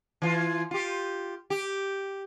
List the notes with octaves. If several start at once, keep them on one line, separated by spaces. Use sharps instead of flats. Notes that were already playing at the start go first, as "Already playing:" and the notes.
E3 F4
F4 G4
G4